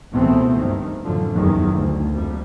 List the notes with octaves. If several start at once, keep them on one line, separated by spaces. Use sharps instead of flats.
C#2 B2 E3 A3 B3 C4
G2 D#3
F#2 A2 D3 F3
F#1 E2 G2 D#3 E3 F#3
D2 G2
F2 G3 A#3